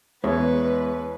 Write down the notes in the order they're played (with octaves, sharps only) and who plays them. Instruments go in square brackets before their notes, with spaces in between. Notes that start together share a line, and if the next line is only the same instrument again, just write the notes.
[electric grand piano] E2 [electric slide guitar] G#3 B3 E4 [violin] B4 [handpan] C#5